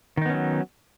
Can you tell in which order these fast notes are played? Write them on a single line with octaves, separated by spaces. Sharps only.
D#3 D#4 B3 C#4 F#3